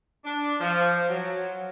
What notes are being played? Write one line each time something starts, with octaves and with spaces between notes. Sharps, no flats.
D4
F3
F#3